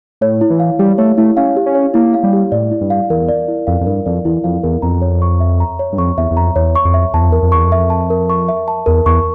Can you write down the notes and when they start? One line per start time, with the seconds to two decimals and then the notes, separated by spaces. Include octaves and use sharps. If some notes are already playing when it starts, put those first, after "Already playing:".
0.21 A2 C#5
0.41 E4
0.50 E3
0.60 F5
0.79 G3 G4
0.98 A3 C#5
1.18 A3 E4
1.37 C#4 F5
1.56 G4
1.66 C#4
1.75 C#5
1.94 A#3 E4
2.14 F5
2.23 G3
2.33 G4
2.52 A2 D5
2.71 E4
2.81 G2
2.90 F5
3.10 E2 A#4
3.28 D5
3.48 E4
3.67 F2 F5
3.81 F2
3.87 G2 A#4
4.06 F2 D5
4.25 E2 E4
4.44 F2 F5
4.63 E2 A#4
4.82 F2 A#5
5.02 C#5
5.22 C#6
5.40 E5
5.60 A#5
5.79 C#5
5.92 G2
5.98 F2 C#6
6.18 E2 E5
6.31 E2
6.37 F2 A#5
6.56 E2 C#5
6.75 C#6
6.85 F2
6.94 E5
7.14 E2 A5
7.22 F2
7.30 E2 A#4
7.43 F2
7.52 E2 C#6
7.65 F2
7.72 E5
7.90 A5
8.10 A#4
8.30 C#6
8.48 E5
8.68 A5
8.86 E2 A#4
9.06 E2 C#6